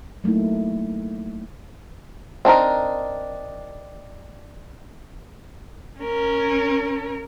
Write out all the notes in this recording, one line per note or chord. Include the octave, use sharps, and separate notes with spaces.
F#3 A3 A#3 D#4 E4
C4 D4 D#4 A#4
C#4 A#4